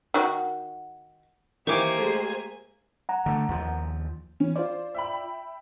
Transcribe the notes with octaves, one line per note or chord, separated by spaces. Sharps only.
D#3 F#4
D#3 E3 A#3 G4 C5 G#5 C#6 D6
G#3 A3
F#5 A#5
D3 A3
D#2 F3
E3 C#4
F4 C5 D5
E5 G5 B5